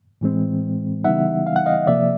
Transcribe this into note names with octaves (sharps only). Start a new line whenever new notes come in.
A2 E3 G#3 C4
C#3 E3 G3 B3 D#4 E5 F#5
F5
F#5
D#5 F5
C3 F3 A#3 D5 E5